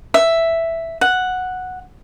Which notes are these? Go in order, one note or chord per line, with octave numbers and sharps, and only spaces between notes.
E5
F#5